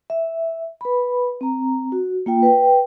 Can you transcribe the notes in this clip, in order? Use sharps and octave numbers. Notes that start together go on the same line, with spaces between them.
E5
B4 B5
C4 A#5
F#4
A#3 F4 G5
B4 G5